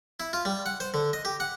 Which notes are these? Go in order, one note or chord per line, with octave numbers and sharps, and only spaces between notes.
E4
F4
G3
F#5
C5
D3
D#5
G4
F#5